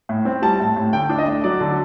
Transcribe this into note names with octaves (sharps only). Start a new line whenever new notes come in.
A2
C4
G3 A5
A2
A2
D3 G5
D4
D#5
A3
F#3 D5
D3